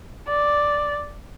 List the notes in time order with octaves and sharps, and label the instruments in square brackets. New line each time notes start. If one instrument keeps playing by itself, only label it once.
[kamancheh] D5